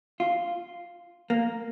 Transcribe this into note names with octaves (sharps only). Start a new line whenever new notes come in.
F4
A#3